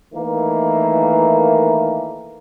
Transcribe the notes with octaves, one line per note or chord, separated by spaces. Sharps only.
D#3 E3 A3 A#3